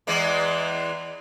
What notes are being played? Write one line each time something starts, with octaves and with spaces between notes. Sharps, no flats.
E2 E3 G#3